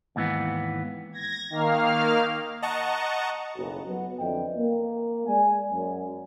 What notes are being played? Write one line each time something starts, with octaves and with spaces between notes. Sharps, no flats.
D#2 G#2 E3 B3
G#6 A#6
D#3 A#3 F5 F6
D#5 F#5 A5 A#5 C#6
F#1 B1 F#4
F#3 B3 F#4
F2 D3 E3 D#5 G5
A#3
G#3 D5 G#5
F#2